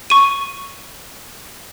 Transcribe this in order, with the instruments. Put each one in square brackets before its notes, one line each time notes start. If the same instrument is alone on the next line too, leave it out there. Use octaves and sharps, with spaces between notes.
[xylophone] C#6 D#7